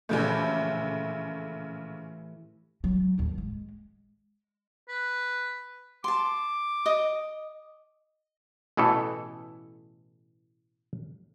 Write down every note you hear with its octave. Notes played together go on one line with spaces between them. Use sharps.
A#1 A2 C#3 E3 A3 G4
F#3 G#3
D#2 A2
G#3
B4
A5 C6 D6
D#5 D#6
A1 B2 E3 A3 A4